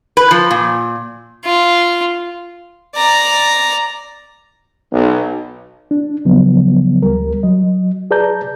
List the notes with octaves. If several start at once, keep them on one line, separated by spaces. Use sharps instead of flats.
B4
F3
A#2
F4
D5 A#5
B1
D4
C#3 F3 F#3 B3
D2 G3 A#4
F#3 D#5
G#4 B4 D5 A5 A#5 G6